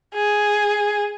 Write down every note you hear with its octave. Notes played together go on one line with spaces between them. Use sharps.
G#4